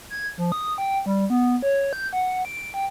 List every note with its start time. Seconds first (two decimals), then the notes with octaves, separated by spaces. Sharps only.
0.10 G#6
0.38 F3
0.52 D#6
0.78 G5
1.06 G3
1.30 B3
1.62 C#5
1.93 G6
2.13 F#5
2.45 D7
2.74 G5